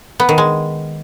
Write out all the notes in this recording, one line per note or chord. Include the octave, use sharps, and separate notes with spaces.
B3
D#3
G#3